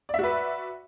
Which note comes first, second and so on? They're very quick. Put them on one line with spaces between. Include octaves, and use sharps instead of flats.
D5 E5 F#4 B4